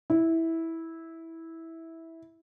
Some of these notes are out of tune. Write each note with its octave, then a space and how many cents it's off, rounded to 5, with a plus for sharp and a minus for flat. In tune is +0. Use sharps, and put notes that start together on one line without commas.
E4 -10